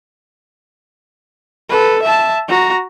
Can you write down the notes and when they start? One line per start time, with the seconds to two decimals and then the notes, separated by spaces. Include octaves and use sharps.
1.69 A4 B4
2.03 E5 A5
2.48 F#4 A#5